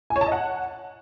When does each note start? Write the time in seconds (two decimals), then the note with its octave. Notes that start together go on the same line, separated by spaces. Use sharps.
0.10 G#5
0.16 C#5
0.21 A5
0.26 D#5
0.32 F#5